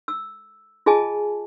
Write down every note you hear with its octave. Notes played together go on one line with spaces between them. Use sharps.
E6
F4 G#4 D#5 G#5 A5